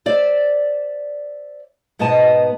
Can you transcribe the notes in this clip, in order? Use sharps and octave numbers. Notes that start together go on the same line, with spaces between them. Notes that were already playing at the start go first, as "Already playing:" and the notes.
C5 D5 E5
G#2 B2 B3 D#5 A5